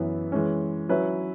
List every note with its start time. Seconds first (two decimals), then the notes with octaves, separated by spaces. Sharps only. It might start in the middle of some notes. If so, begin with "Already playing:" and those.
Already playing: F#2 E3 B3 E4 B4
0.32 E3 G#3 C#4
0.89 F#3 C#4 E4 B4